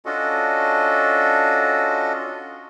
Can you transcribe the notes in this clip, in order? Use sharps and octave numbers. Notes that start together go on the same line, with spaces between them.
C#4 D4 F4 F#4 A4 D#5